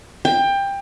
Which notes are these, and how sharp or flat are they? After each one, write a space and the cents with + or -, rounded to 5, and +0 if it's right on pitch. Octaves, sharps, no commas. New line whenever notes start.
G5 +20